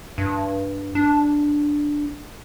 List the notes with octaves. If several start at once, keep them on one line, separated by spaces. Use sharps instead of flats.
G2
D4